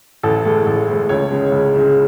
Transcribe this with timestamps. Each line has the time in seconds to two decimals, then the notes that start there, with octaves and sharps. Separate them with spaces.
0.23 A1 A4
0.45 A2 G#3
0.66 A1
0.88 A2 G#3
1.09 C#2 C#5
1.31 C#3 G#3
1.52 C#2
1.74 C#3 G#3